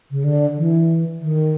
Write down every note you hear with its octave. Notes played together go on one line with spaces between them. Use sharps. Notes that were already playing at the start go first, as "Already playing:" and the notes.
C#3
D3
E3
D#3